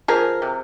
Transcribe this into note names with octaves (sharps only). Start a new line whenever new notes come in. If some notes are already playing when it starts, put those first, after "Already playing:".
F3 G#4 A#4
C3